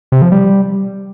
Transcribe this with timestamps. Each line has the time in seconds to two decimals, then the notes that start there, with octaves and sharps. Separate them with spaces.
0.12 C3
0.22 F3
0.32 G3